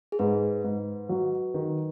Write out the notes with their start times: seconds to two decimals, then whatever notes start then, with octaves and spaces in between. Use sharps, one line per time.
0.12 G#4
0.19 G#2 B4
0.64 G#2
1.09 F#3
1.54 D#3